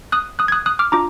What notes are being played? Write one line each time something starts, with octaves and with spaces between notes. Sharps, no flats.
D#6 F#6
D#6 F#6
G#6
D#6 F#6
D#6 F#6
D6 F6
D4 F4 A#5 D6